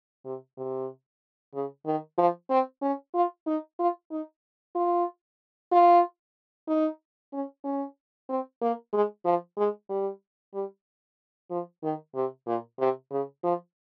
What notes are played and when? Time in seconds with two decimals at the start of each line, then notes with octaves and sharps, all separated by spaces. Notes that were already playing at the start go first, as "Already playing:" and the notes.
0.25 C3
0.57 C3
1.54 C#3
1.86 D#3
2.18 F3
2.50 C4
2.82 C#4
3.14 F4
3.47 D#4
3.79 F4
4.11 D#4
4.75 F4
5.72 F4
6.68 D#4
7.33 C#4
7.64 C#4
8.29 C4
8.62 A#3
8.93 G#3
9.25 F3
9.58 G#3
9.89 G3
10.54 G3
11.50 F3
11.83 D#3
12.15 C3
12.46 A#2
12.79 C3
13.11 C#3
13.43 F3